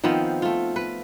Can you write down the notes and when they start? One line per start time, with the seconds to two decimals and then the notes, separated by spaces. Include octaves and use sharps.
0.04 D#3 F3 B3 C4
0.42 A3 F4
0.76 B4